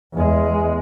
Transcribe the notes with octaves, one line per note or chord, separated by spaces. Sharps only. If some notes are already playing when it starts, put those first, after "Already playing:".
E2 G#3